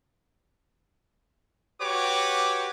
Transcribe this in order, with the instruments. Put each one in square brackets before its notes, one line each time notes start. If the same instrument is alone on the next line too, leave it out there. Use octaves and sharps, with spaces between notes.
[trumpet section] F#4 G4 B4 C#5 D6